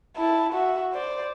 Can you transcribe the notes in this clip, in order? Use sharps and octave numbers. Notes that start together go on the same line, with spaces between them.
E4 A5
F#4 E5
C5 D5